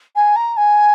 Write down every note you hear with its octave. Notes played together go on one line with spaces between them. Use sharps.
G#5
A#5
G#5